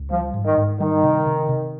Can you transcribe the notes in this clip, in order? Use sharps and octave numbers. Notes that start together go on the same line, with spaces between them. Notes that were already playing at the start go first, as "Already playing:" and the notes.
Already playing: C#2
F3 G3
G#2
D#3
G#2
D#3 G3
C3
C3
C3